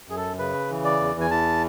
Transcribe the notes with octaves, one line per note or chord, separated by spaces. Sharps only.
F#2 G#4
A4
C#3 B4
E3
D5
E2
G#5
E3 A5